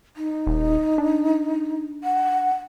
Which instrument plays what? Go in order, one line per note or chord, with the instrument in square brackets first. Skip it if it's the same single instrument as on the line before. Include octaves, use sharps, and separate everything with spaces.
[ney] D#4
[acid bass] D#1
D4
[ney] F#5